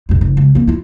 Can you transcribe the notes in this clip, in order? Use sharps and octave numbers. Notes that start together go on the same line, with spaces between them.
B1 F2
F#1
C#2
A#3 C4
E4 F4